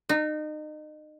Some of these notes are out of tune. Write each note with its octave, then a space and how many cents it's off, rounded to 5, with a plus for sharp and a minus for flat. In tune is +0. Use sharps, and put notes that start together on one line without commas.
D#4 -30